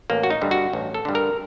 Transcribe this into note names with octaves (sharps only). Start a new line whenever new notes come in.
A1 A#3
F#4
D#4
G2 D3
F#4
A1
A4
G2 D3
A#4